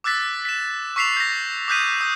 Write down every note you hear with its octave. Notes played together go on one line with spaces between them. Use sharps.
D6 E6 F#6 A6 B6
B6 E7
C#6 E6 B6 C7 E7 F7
G6 A#6
D6 D#6 F#6 G6 B6 D#7
D#6 G6